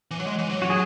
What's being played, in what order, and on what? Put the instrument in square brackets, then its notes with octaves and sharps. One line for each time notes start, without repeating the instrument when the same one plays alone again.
[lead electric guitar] E3
F#3
G#3
E3
F#3
[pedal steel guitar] F#4
G#4